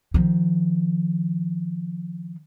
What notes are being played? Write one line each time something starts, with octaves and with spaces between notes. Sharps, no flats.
D#3 F3